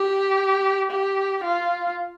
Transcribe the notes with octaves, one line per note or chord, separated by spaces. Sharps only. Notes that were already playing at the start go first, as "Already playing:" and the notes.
Already playing: G4
G4
F4